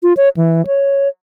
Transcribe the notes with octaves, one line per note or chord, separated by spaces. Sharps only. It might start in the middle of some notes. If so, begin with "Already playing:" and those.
F4
C#5
E3
C#5